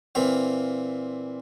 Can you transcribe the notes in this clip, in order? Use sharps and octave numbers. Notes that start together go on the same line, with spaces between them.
A#2 E3 C4 F5